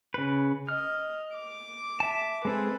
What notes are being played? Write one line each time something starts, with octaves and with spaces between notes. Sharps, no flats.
C#3 B4
D#5 F6
D6
E5 A5
G#3 C4 G#4 A4 B4